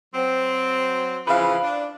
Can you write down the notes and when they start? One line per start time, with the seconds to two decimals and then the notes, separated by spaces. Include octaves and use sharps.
0.15 F#3 C4
1.27 C#3 E3 F3 B4 F5
1.64 D4